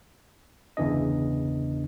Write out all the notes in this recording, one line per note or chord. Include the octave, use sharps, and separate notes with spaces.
G1 E2 C#3 E3 D4 D#5